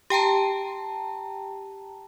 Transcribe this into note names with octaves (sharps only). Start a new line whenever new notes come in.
G4 G5 A5 A#5